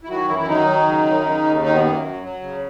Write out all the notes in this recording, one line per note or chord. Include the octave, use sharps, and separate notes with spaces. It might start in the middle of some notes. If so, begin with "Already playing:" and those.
E4
D#3 F#3 F#4
F#2 E3 E4
E4
D#3 F#3 D#4
F#3
C#3
F#2
C#3
D#2
D#3 D#4
B2 B3
F#2 A#3
F#3
F#3
C#3